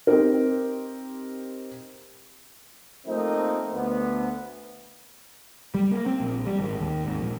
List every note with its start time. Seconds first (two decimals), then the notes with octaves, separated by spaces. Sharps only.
0.07 C4 D#4 G4 A#4
3.06 F3 A3 A#3 C4 D#4
3.73 D2 B3
5.74 G3
5.92 A#3
6.06 C4
6.20 A#1
6.47 G3
6.59 G#1
6.80 D#2
7.05 G#1
7.21 A#1